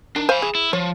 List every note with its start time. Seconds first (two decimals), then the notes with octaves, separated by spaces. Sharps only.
0.16 D#3 D4
0.29 C5 F5 G#5 B5
0.42 G#4
0.55 E4
0.73 F3 C#5